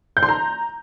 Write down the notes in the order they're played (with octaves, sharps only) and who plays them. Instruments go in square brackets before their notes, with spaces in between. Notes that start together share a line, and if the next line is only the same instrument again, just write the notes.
[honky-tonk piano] G6
C6
A#5